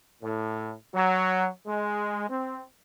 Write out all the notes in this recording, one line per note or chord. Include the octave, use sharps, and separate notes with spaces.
A2
F#3
G#3
C4